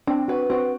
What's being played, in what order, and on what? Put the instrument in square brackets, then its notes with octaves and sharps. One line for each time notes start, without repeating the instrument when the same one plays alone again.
[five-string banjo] C4 [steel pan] D4
[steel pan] F#4 [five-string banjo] B4
[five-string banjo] C4 [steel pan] F#4